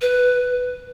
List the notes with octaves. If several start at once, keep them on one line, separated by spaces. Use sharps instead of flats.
B4